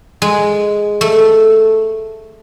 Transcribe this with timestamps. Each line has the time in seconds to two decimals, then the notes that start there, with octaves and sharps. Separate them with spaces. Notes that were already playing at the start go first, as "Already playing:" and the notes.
0.22 G#3
1.01 A3